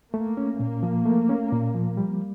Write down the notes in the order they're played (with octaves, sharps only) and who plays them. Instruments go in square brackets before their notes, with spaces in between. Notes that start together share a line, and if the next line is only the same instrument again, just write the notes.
[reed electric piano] A3 [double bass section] A#3
[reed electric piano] C#4
[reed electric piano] A#2 [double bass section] A#3
[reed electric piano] F3
A3
C#4
A#2
F3
G3